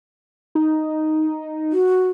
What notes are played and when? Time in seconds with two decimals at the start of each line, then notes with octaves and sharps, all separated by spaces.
0.55 D#4
1.72 F#4